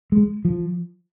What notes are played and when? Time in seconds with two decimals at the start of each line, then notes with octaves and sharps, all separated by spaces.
0.12 G#3
0.45 F3